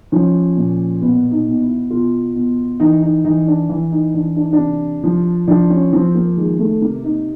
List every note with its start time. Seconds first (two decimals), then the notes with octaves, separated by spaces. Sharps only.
0.12 F3 C#4
0.57 A#2
1.02 B2 B3
1.31 D#4
1.46 B2
1.62 E4
1.91 B2 F4
2.35 B2
2.80 E3 D#4
3.02 D#4
3.25 E3 D#4
3.47 D4
3.69 E3
3.92 D#4
4.14 E3 D4
4.37 D4
4.44 D#4
4.53 D4
4.59 C3
5.04 F3
5.48 F3 D4
5.70 C#4
5.93 F3 C4
6.15 A#3
6.37 D#3 G#3
6.59 A3
6.82 C3 A#3
7.04 D#4